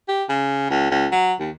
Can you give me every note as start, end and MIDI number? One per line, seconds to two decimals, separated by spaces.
0.08 0.24 67
0.29 0.65 49
0.70 0.88 37
0.91 1.07 37
1.12 1.33 54
1.40 1.50 39